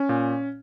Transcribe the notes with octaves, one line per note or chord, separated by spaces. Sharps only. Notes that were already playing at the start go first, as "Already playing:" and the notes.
Already playing: C#4
A#2